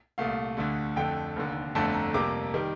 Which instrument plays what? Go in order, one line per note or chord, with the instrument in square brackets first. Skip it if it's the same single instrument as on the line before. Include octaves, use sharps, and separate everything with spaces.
[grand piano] C2 A#2 A3 F5
D2 D3 A3
F2 D3 A3 G5
F1 D#2 D3
G1 F2 D3 A3 A5
A#5
F2 C3 G3 A#3 D6
D#3 G3